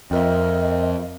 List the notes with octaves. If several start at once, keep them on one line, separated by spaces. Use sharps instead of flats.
F2 C4 A#4 D#5 E5